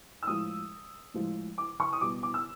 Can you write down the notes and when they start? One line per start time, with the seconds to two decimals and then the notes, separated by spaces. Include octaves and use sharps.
0.23 E6
0.27 A2 F3 G#3 D#6
1.14 A2 F3 G#3
1.58 D6
1.80 C#6
1.93 D#6
2.01 B2 G3 D6
2.23 D6
2.34 E6